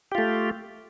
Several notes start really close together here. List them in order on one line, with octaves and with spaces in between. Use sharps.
G4 F4 A3